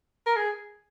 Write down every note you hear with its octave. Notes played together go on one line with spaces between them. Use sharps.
A#4
G#4